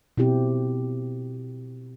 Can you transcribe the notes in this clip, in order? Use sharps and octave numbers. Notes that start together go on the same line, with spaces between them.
B2 C4 E4 G4